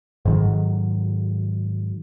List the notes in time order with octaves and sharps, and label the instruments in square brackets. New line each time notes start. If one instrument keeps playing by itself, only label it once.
[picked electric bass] G#2 D#3 F#3